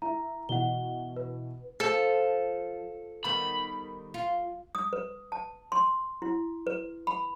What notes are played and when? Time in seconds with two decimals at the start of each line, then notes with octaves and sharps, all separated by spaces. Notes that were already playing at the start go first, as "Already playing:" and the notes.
0.02 E4 A#5
0.49 B2 E3 F#5 G7
1.16 B4
1.80 F3 A4
3.24 D#3 G3 B3 B5
4.14 F4
4.75 D#6
4.93 B4
5.32 A5
5.72 C6
6.22 E4
6.67 B4
7.07 B5